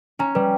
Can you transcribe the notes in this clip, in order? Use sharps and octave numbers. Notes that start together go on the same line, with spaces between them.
C#4 A#5
G3 B4